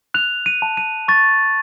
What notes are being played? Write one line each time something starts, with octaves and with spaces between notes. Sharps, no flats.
F#6 F7
D#7
A5
D#7
C#6 A6